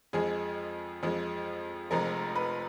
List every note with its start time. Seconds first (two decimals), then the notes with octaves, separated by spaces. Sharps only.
0.13 F2 F3 G#3 G#4
1.03 F2 F3 G#3
1.90 F1 F2 F3 G#3 A#4
2.36 B4